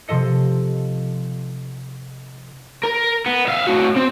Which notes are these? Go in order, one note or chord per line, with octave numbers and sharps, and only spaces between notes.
C3 F3 A4 D#5 C#7
A#4
B3
E5 F5
A2 F#4
C4